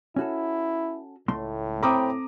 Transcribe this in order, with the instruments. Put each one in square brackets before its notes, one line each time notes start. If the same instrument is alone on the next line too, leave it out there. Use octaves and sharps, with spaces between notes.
[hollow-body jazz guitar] C#4 F#4 A4 [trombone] E4
[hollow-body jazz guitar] C#2 A3 C6 [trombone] A2
[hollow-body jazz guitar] C4 A4 [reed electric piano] C5 G5 B5 [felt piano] A#5 D6 D#6